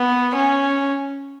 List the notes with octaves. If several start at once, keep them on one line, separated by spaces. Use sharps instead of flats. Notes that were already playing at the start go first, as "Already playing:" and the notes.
Already playing: B3
C#4